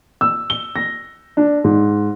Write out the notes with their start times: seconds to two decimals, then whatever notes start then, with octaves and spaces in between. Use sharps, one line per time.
0.21 E6
0.50 G7
0.76 A#6
1.37 D4
1.64 G#2